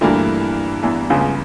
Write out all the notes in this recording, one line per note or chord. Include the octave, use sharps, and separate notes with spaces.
D2 G2 D3 E3 A#3 E4
E2 E3
C#2 C#3